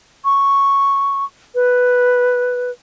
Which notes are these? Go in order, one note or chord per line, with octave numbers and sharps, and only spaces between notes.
C#6
B4